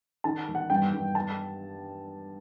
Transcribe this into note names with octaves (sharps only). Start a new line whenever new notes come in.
D#3 A5
E1
F#5
G2 G5
G2
A5